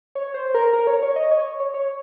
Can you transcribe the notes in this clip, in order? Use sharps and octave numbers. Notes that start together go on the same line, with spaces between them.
C#5
C5
A#4
A#4
C#5
C#5
D#5
C#5
C#5
C#5